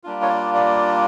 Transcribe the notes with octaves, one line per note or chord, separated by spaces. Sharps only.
G3 A#3 D4 F4
C#5
D5
D5